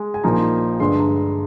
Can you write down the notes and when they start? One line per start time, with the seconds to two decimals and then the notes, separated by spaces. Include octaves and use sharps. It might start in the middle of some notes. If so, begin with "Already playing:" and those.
Already playing: G#3
0.14 G#5
0.24 A#1 A#2 F3 A#3 D#4 A#5
0.80 G2 D3 G#3 C6
0.99 A#5